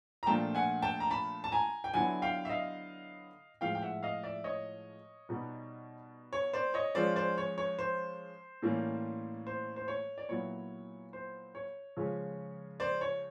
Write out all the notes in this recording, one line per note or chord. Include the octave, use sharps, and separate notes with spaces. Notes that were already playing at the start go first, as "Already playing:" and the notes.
A#5
A#2 F3 A3 D4 F4 G5 A5
F#5 G#5
G5 A5
A#5
A5 B5
A5
G#5 A#5
G5
D3 F#3 B3 E4 F#5 G#5
F5 G5
E5
D#5 F5
A2 F3 G#3 F5 G5
G5
E5 F#5
D#5 F5
D5 E5
C#5 D#5
B2 G3 B3 D#4
C#5
C5 D5
C#5 D#5
F3 G#3 C#4 F4 C5 D5
C5 D5
C#5
C#5
C5
A2 E3 G3 A#3 C#4
C5
C5
C#5
D5
A#2 F#3 B3 E4 C#5
C5
C#5
C#3 F3 G#3 C#4
C5 D5
C#5